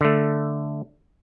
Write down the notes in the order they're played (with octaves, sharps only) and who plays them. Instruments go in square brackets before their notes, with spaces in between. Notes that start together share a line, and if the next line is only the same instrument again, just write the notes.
[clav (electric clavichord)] D3 A3